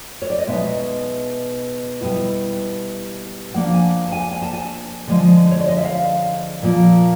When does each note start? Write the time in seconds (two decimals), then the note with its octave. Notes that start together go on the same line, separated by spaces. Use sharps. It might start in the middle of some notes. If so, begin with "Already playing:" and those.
0.22 C#5
0.30 D5
0.38 D#5
0.47 B2 G#3 B3 D#4 E5
2.01 B2 G3 B3 E4
3.54 F3 A#3 D4 F#5
3.74 G#5
4.08 A5
4.12 G#5
4.31 G#5
4.42 A5
4.53 G#5
5.08 D3 F3 G#3
5.51 C#5
5.59 D5
5.68 D#5
5.77 E5
5.84 F5
6.62 A#2 F3 A#3